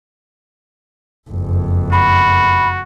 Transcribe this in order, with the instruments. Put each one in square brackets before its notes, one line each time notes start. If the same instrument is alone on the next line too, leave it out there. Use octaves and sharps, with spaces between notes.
[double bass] F#1 F2
[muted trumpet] F#4 [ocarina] B5